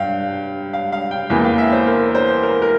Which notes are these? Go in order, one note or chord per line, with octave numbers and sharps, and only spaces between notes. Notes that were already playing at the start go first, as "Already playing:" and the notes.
Already playing: G2 F5 G5
F5
F5
G5
E2 E3 A#3 G5
F5
E5
C5
A#4
C5
A#4
A#4